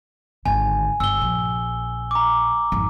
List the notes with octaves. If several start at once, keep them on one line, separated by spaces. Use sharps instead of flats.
G#1 D3 G#5
G1 E6 G7
A#1
A#5 D6
G#1 F2